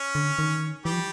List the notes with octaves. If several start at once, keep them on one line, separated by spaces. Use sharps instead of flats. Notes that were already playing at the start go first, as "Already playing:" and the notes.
Already playing: C#4 C#5
D3
D#3
E3 G3 G4
F3